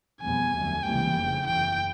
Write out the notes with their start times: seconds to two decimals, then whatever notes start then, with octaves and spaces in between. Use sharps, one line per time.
0.21 F1 E2 B2 G3 B3 G#5
0.52 F1 D#2 D3 F#3 A3
0.83 C#2 C3 E3 G3 A#3 G5
1.16 F1 F2 C#3 E3
1.46 F#1 E2 C#3 E3 G5